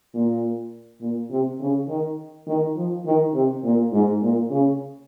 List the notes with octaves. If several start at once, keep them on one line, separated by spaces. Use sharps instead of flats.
A#2
A#2
C3
C#3
D#3
D#3
F3
D#3
C3
A#2
G#2
A#2
C#3